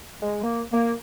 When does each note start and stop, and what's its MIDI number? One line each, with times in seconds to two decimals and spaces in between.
0.22 0.42 56
0.43 0.63 58
0.73 0.93 58